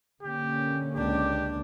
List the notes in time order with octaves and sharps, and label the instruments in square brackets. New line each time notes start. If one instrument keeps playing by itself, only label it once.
[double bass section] D3 A#3 C#4 [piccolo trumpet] G4
[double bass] C#2 D4 [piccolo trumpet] G4